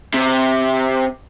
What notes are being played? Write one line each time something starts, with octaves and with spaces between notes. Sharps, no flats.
C3